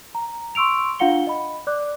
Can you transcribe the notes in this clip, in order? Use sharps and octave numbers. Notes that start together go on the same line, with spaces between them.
A#5
C6 C#6 E6 D7 F7
D4 F4 F5 F#5 C#7 G7
D#5 B5
D5 D6 F#6